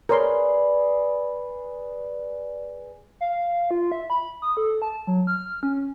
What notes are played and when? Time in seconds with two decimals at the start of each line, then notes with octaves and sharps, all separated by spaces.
0.09 G#4 A#4 B4 C#5 D5 C6
3.21 F5
3.71 F4
3.92 E5
4.10 B5
4.42 D#6
4.57 A4
4.82 A5
5.07 F#3
5.27 F6
5.63 C#4